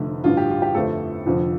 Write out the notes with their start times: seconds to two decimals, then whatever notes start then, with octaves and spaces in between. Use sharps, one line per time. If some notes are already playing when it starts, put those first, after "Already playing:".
Already playing: F1 F2 D3 A3
0.24 A1 G2 D3 F4
0.37 G4
0.50 F4
0.62 G4
0.75 G1 F2 F3 A3 A4
1.26 F1 F2 D3 F3